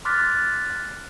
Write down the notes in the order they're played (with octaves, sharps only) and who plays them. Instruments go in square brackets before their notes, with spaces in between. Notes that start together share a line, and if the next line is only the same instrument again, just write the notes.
[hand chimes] C6 D6 F6 F#6 A6 B6